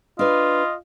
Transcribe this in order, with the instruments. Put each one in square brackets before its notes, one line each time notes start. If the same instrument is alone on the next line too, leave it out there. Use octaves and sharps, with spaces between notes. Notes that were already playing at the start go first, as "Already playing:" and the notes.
[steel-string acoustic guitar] D4 B4 [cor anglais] F4 [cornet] D#5